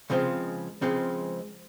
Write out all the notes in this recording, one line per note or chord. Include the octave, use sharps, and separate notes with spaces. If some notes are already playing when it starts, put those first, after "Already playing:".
C#2 C#3 F3 G#3 C4
C#2 C#3 F3 G#3 C4